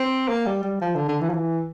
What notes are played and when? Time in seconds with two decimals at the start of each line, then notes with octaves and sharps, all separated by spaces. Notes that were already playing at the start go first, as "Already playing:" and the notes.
Already playing: C4
0.29 A#3
0.46 G3
0.64 G3
0.81 F3
0.95 D3
1.08 D3
1.21 E3
1.30 F3
1.34 E3